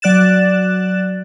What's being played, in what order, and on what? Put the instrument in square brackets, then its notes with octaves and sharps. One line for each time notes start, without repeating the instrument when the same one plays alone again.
[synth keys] F#3 D5 F#6 A6 E7